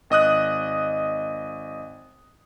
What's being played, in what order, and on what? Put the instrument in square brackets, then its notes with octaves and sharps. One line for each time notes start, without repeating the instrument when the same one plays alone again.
[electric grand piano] G#1 D#5 D#6 F#6